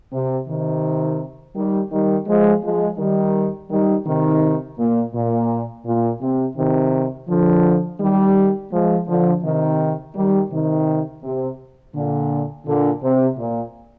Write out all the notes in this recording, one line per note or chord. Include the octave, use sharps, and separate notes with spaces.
C3
C3 D#3
D#3 G3
D#3 G3
F3 G#3
F3 G#3
D#3 G3
D#3 G3
C3 D#3
A#2
A#2
A#2
C3
C3 D#3
D3 F3
D#3 G3
F3 G#3
D3 F3
C3 D#3
D#3 G3
C3 D#3
C3
A#2 D3
A#2 D3
C3
A#2